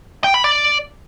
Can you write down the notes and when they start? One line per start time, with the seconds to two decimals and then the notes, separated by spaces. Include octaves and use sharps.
0.24 G5
0.34 B5
0.44 D5